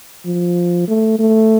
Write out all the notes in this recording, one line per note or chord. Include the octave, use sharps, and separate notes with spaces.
F3
A3
A3